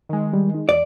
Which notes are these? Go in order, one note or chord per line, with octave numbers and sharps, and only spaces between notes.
D#3 G#3
G3
D#4
E2 D5